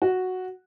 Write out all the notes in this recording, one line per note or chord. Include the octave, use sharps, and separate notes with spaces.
F#4